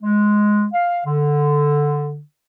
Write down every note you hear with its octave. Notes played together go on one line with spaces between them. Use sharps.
G#3
F5
D3